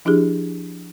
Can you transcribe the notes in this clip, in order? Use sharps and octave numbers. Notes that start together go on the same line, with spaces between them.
F3 D4 E4 G4 G#4